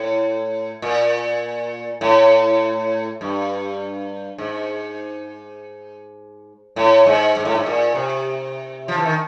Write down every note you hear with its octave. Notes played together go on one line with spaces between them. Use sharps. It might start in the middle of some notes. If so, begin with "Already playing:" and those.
Already playing: A2
A#2
A2
G2
G#2
A2
G#2
G#2
A2
G#2
A#2
C3
F3
E3
D#3